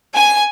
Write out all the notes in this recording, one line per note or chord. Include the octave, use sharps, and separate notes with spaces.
G#5